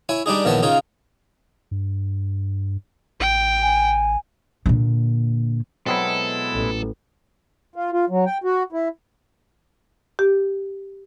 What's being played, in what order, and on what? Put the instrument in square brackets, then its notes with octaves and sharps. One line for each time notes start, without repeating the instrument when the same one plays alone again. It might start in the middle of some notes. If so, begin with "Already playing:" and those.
[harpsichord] E4 C#5 G#5
G3 D4 D#4 G#4
A#1 D#3 E3 B3 C#5 A5
C#3 D#4 F4 C#5
[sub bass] G2
[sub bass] A1 [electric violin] G5
[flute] G#5
[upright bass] A#2 D3
[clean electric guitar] B2 G#3 E4 [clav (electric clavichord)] F#3 B3 C4 [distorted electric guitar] A4
[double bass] A1
[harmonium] F4
F4
F#3
G5
F#4
E4
[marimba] G4